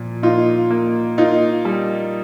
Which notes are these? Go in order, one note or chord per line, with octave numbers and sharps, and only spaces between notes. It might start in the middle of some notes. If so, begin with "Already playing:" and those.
Already playing: A#2 F3
A#3 D#4 F4
A#3
A#3 D#4 F4
G3